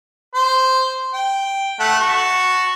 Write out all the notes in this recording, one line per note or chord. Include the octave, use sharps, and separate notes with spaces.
C5
G5
A3 F#5 A5
F#4 A5 C#6